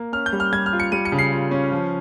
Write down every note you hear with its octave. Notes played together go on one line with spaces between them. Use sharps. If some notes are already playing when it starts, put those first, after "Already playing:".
Already playing: A#3
C#4 F6
G6
G3
F6
G3 G#6
F6
F4
C#7
G3 D#7
C#7
C#3
C7
F4
C#4
F3